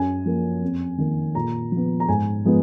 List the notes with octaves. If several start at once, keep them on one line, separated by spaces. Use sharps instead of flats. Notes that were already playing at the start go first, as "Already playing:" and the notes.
Already playing: F#2 G#5
F3 A#3
F2
D#3 A#3
A#2 A#5
F3 B3
A#5
G#2 G#5
F3 G#3 B3